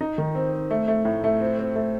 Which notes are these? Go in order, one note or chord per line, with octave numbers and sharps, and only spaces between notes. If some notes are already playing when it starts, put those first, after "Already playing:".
D#4
D#3
C4
C4
A3
A3
A2
A3
C4
C4
A3